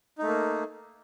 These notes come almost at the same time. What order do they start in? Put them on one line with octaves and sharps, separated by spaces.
D#4 A3 A#3